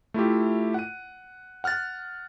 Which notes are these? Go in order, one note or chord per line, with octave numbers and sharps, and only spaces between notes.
A3 E4 F4 G4
F#5 D#7
F#5 F6 F#6 A6